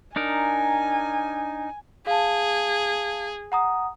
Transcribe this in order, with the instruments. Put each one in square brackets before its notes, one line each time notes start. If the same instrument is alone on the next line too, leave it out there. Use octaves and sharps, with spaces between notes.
[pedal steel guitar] D4 D#4 A#4 [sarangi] G#5
[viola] G#4 [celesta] F5 A5
[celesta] F#5 A#5 D#6